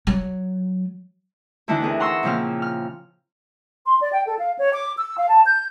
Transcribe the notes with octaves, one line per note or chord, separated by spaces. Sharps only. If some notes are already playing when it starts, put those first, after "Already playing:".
F#3
D2 D3 E3 D#4 E4
C4 G#4 A#4
F#5 A#5 C6 C#6 E6
A#2 C#3 F3 C4 F6
F6
C6
D5
G5
A4
F5
C#5
D6
E6
F5
A5
G6